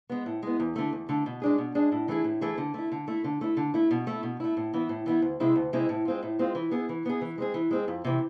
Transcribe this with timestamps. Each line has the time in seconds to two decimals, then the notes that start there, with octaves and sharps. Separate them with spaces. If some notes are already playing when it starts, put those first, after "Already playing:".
0.10 G#3 B3
0.26 A2
0.43 G#3 B3
0.60 E2
0.76 D3 A3
0.93 E2
1.09 D3 A3
1.26 B2
1.42 G#3 D4 G#4
1.58 B2
1.75 G#3 D4 G#4
1.92 A2
2.08 E3 A3 E4 G#4
2.24 A2
2.41 E3 A3 E4 G#4
2.58 D3
2.74 A3 E4
2.92 D3
3.08 A3 E4
3.24 D3
3.41 A3 E4
3.57 D3
3.74 A3 E4
3.91 B2
4.07 A3 E4
4.23 B2
4.40 A3 E4
4.57 A2
4.74 E3 B3 E4
4.89 A2
5.06 E3 B3 E4
5.22 D2
5.40 C3 G#3 C4 E4
5.56 D2
5.73 C3 G#3 C4 E4
5.89 A2
6.05 G#3 C4 F4
6.23 A2
6.39 G#3 C4 F4
6.55 E3
6.71 B3 E4 G#4
6.89 E3
7.06 B3 E4 G#4
7.21 E3
7.38 G#3 C4 G#4
7.54 E3
7.71 G#3 C4 G#4
7.88 F2
8.05 C3 E3